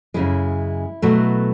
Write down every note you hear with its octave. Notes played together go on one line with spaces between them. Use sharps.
F#2 C#3 G#3 E4
B2 F#3 A3